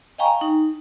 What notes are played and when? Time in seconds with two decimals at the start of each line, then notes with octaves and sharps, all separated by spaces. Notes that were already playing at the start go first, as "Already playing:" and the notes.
0.18 D#5 F5 G5 G#5 A#5 C#6
0.41 D#4